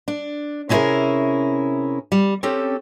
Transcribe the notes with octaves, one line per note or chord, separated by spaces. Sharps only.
D4
C3 C#4 D#4 E4 G#4 A#4
G3
C4 C#4 G4 A4